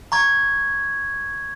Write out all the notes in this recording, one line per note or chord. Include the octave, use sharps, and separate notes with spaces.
A#5 C#6 G#6